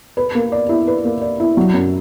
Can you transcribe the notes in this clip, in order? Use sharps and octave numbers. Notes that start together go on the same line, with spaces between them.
B4
A#3
D5
E4
B4
A#3
D5
E4
F#3
F#2